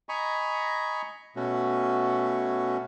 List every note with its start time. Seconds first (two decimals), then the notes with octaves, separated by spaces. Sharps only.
0.09 D#5 G#5 A#5 B5 C#6
1.36 B2 A3 C#4 F#4